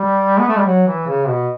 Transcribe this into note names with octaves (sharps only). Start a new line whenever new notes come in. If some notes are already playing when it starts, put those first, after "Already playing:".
Already playing: G3
B3
A3
G3
F#3
E3
C#3
B2